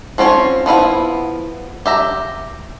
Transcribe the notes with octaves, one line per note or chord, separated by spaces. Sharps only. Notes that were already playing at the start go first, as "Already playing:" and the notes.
F3 C4 C#4 E4 C#5
F3 B3 E4 F5
G4 E5 A#5